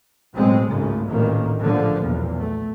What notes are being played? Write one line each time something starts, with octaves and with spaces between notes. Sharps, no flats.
A1 B2 F#3 G#3 C4
G#1 C#2 G#2 C#3 G#3 A3
A1 D2 A#2 D#3 A#3
A#1 D3 F3
B1 E2 A#2
A3